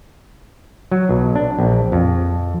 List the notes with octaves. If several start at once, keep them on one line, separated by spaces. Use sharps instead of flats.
F#3
B1
D4
A#1
F2